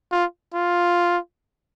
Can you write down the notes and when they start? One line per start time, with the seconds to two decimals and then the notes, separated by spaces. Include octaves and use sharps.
0.12 F4
0.54 F4